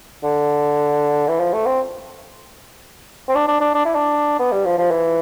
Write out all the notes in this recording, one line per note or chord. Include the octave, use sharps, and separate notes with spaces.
D3
E3
F3
A3
C4
C4
D4
D4
D4
D4
E4
D4
B3
G3
F3
F3
E3